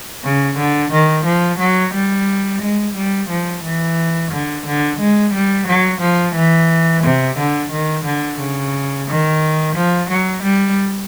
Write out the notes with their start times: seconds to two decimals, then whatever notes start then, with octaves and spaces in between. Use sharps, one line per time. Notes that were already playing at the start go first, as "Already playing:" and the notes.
0.25 C#3
0.58 D3
0.92 D#3
1.26 F3
1.59 F#3
1.95 G3
2.62 G#3
2.95 G3
3.30 F3
3.64 E3
4.32 D3
4.67 D3
5.00 G#3
5.34 G3
5.67 F#3
6.01 F3
6.35 E3
7.04 C3
7.38 D3
7.72 D#3
8.05 D3
8.39 C#3
9.08 D#3
9.76 F3
10.10 F#3
10.44 G3